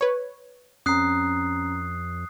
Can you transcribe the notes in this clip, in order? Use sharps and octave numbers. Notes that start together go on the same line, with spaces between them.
B4 C#5
F2 C#4 A#5 D#6 F#6 C7